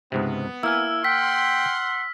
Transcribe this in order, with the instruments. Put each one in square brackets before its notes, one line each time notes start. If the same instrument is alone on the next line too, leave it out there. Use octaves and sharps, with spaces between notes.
[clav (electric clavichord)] C#2 G#2 C3 [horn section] B3
[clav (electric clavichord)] A#3 G#5 [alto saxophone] E4 [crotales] E6 F6
[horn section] F#5 C6 [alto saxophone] G5 [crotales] B6